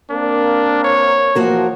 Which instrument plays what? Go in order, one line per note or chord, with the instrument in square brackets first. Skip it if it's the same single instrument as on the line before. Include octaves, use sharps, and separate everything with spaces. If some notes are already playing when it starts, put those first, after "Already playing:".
[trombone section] A#3 C4 A#4 [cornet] D4
[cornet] C#5
[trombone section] E2 E3 F3 [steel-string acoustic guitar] A#3 F#4 A#4